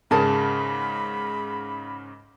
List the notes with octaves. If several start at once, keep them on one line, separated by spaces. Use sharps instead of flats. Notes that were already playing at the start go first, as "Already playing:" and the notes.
G#2 C#3 G#4 A#4 A5 B5